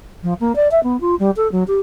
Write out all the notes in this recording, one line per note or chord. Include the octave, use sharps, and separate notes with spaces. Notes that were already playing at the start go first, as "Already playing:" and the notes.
F3
A#3
D5
E5
B3
F4
G3
A4
F#3
G4